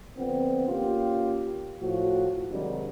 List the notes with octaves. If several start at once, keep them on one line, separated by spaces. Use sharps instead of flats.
D3 F3 B3 C4
A#3 C#4 F4 G4
A2 F3 F#4
G#2 C3 D#3 F#3 G3 D4